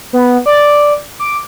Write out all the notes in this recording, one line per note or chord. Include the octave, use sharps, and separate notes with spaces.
B3
D5
D6